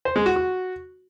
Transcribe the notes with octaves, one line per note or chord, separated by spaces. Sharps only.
C5
G#3
F#4
F#4